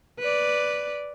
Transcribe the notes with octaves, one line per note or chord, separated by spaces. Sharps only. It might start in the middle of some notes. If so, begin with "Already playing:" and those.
B4 D5